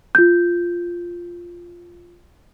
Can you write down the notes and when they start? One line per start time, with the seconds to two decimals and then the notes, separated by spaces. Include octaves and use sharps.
0.15 F4 G6